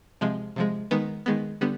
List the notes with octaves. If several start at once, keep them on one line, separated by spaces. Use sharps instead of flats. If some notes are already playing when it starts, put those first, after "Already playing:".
C3 F3 G#3
C3 F3 G#3
D#3 G#3 B3
D#3 G#3 B3
D3 G3 B3